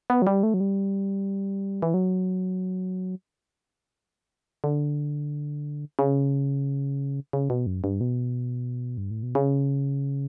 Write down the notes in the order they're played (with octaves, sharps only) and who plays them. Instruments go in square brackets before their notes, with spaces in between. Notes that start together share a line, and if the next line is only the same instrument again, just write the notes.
[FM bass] B3
F#3
G3
A3
F#3
G3
E3
F#3
D3
C#3
C#3
B2
F#2
G2
B2
G2
A2
B2
C#3